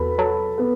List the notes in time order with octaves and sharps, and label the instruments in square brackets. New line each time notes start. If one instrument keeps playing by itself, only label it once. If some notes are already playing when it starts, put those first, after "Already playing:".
Already playing: [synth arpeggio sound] E2 [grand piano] F#4 A4 B4 B5
[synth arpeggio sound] F#3 [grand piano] A4 A5
[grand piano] B3 B4